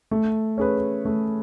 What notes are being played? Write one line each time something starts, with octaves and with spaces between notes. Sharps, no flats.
A3
C#4 G#4 B4
A3